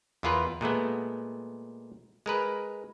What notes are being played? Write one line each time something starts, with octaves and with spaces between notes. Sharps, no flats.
E2 E4 F4 A#4 B4
A#2 G#3 A3 B3
G#3 A#4 B4